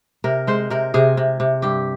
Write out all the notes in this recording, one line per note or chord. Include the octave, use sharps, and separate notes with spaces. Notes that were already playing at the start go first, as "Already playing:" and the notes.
C3 A#4
G#3 C5
C3 A#4
C3 G#4
C3
C3
G2 G4